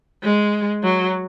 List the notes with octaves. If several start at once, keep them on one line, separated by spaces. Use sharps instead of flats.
G#3
F#3